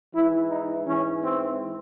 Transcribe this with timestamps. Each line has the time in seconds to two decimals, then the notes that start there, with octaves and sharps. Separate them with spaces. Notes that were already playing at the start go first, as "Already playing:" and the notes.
0.14 G#2 E3 E4
0.50 D#4
0.86 G#2 E3 C#4
1.22 C4